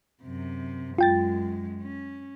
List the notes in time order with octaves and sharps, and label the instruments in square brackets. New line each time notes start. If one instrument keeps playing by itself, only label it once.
[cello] F#2 C3
[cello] F#2 G#3 [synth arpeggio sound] F4 G5 A6
[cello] C#4